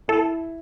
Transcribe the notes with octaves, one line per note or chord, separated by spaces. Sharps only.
E4 A4